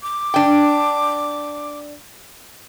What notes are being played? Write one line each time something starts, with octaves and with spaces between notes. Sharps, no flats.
D6
D4 G5